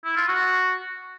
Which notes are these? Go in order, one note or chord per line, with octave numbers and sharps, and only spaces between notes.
E4
F4
F#4